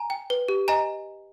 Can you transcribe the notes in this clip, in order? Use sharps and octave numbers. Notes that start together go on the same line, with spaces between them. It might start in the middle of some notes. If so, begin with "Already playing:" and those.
Already playing: G#5 A#5
G5
B4
G4
D#5 G#5 A#5